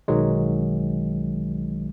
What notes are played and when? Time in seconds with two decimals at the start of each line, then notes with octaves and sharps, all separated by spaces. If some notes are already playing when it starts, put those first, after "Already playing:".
0.08 B1 D#3 F#3 G#3